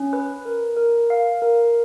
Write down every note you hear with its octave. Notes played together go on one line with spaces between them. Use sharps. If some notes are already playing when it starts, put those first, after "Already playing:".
Already playing: C#4
B4
A#4
A#4
F5
A#4